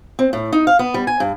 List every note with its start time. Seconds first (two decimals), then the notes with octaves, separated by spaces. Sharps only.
0.19 C4
0.33 A2
0.52 D#4
0.67 F5
0.79 B3
0.94 G3
1.07 G#5
1.20 G2